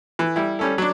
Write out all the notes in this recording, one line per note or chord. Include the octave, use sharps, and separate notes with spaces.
E3
G3 E4
G3 C#4 A4
F#3 D4